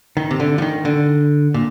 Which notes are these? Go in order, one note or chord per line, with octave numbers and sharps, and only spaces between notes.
D#3
C3
D3
F3
D#3
D3
A#2